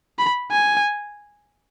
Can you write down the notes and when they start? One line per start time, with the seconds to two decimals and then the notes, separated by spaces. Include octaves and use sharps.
0.19 B5
0.51 G#5